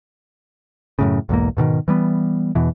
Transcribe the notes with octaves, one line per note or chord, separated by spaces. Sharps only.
F#2 A2 C#3
B1 E2 G#2 A#3
G#2 B2 D3 D#3
E3 G3 B3
E2 B2 E3